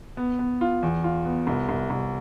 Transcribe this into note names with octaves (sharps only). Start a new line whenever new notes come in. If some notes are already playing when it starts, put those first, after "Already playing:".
B3
B3
F4
E2
F4
B3
C2
C2
C2